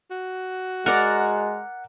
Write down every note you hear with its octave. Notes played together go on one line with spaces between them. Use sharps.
F#4
G#3 A#4 D5 F#5 A#5